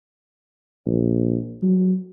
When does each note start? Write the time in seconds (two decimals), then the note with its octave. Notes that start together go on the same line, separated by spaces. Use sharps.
0.86 A#1
1.62 F#3